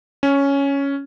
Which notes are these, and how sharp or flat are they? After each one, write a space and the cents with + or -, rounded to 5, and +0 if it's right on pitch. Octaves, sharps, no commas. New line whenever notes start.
C#4 +5